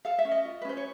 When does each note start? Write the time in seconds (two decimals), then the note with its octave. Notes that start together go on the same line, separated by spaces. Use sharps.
0.05 A4 F5
0.19 E5
0.25 C#4
0.31 D#5
0.45 F4
0.62 B4
0.65 C#4 C5
0.77 C#5